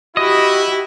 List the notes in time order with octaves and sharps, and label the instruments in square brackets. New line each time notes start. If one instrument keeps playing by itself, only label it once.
[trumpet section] E4 [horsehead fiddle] F#4 G4 [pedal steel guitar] D#5